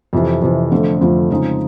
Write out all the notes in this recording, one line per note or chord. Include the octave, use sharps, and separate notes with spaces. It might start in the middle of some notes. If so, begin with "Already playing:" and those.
F2 C3 E3
F2 C3 E3
F2 D3 F3 A3
F2 D3 F3 A3
C#3 F3 G#3 C4 D#4